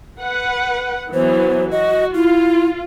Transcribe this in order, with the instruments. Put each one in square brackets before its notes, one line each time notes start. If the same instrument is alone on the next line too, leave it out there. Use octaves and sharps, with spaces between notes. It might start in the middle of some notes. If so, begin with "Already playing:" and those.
[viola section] B4 F#5
[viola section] E3 F#3 B3 [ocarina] C5
[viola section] F#4 [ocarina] D#5
[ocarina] E4 [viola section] F4